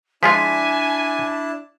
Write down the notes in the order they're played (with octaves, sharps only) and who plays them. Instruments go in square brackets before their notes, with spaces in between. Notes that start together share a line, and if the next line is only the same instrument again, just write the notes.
[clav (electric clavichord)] F3 G#3 F4 [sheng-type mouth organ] D4 E4 A5 [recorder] G#5 [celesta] B6